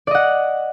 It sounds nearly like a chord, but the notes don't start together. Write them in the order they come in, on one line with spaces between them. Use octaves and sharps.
D5 D#5 F#5